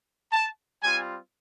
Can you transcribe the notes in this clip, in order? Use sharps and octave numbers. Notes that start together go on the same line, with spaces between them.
A5
G3 C4 F4 G#5